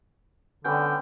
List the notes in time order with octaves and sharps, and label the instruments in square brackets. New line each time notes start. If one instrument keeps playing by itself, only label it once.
[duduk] D3 [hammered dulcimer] G3 B3 C#4 [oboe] G5